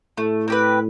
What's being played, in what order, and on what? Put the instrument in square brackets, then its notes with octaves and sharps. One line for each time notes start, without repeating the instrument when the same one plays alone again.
[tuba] A2 [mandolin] A3
[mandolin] C4 G4 B4